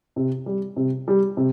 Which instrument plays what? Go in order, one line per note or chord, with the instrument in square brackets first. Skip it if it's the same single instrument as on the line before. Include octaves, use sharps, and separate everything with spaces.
[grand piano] C3
G3
C3
G3
C3